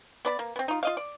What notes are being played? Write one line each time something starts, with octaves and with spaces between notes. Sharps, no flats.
B3 D5 B5
A#3
B3 C4
D#4 F4
F4 D#5 F5
D5